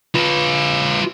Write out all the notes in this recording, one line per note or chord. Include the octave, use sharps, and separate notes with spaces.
F4 B4